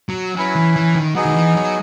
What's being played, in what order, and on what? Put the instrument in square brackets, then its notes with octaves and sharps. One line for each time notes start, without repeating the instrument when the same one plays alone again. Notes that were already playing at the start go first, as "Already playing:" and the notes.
[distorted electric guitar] F#3
[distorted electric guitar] F#3 [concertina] C#4 E4 B4
[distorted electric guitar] E3
E3
D#3
[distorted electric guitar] F#3 [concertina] B3 D#4 G#4 D#5
[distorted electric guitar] D#3
E3
F#3